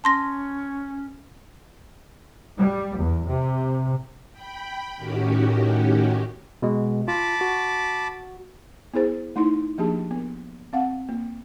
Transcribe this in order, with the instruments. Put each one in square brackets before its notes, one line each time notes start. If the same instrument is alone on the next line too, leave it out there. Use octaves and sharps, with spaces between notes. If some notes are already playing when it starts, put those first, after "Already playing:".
[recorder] C#4 [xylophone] A5 C6 A#6
[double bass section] G3
E2
C3
[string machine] G5 B5
A2 D#3 C#4 F#4 G4
[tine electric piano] B2 G#3
[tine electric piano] F4 [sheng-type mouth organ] A5 B5 D6
[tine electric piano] F#4
[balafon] B3 E4 G#4 C5
A3 D#4 E4 C6
F3 A#3 D4 G4 G#4 A5
B3
C4 F5 F#5
A#3